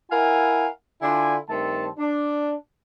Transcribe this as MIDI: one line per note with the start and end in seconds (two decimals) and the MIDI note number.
0.11 0.68 64
0.11 0.68 70
0.11 0.68 77
0.11 0.68 78
0.11 0.68 80
1.02 1.37 50
1.02 1.37 62
1.02 1.37 64
1.02 1.37 65
1.02 1.37 80
1.49 1.88 43
1.49 1.88 51
1.49 1.88 57
1.49 1.88 60
1.49 1.88 81
1.98 2.54 62